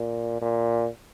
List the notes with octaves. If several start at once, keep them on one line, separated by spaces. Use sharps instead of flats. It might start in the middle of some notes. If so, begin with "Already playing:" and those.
Already playing: A#2
A#2